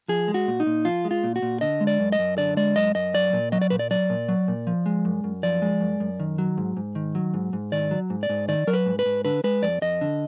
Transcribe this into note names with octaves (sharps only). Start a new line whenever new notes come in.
F3 G#4
G#3
F#4
A#2
D#4
A#2
F3 F4
G#3
F4
A#2
F#4
A#2
D3 D#5
G#3
D5
F#2
D#5
F#2
D3 D5
G#3 D5
F#2 D#5
F#2 D#5
F#3 D5
A#2
F#3 D#5
D5
A#2 B4
D5
F#3 D5
A#2
F#3
A#2
F3
G#3
F#2
F#2
F3 D5
G#3
F#2
F#2
D#3
F#3
G#2
G#2
D#3
F#3
G#2
G#2
D#3 D5
F#3
G#2
D5
G#2
D#3 D5
F#3 A#4
B4
G#2
B4
G#2
D3 B4
G#3 B4
F2 D5
F2 D#5
D3